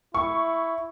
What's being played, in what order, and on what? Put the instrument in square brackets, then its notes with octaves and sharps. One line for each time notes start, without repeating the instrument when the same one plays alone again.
[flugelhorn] E4 [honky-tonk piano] C#6